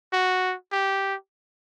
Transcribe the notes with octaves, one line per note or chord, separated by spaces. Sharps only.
F#4
G4